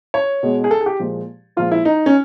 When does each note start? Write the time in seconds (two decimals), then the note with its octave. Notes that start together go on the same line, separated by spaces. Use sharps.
0.14 C#5
0.43 B2 G#3
0.64 G#4
0.71 A4
0.81 G#4
0.86 G4
0.99 A#2 F3 G#3
1.56 A#2 F3 G#3 F4
1.72 E4
1.85 D#4
2.06 C#4